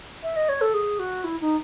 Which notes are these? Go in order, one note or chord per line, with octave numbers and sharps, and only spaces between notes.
E5
D#5
C#5
A4
G#4
F#4
E4
D#4